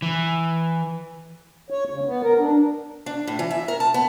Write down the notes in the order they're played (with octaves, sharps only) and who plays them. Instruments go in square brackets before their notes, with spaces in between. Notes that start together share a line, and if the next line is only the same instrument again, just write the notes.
[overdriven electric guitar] E3
[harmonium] C#5
C#3
B3
A#4
D4
[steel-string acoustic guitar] D4
A2
E3
E5
A#4
A5
B3